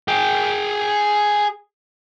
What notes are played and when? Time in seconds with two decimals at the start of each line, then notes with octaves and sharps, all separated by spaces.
0.08 G#4 G5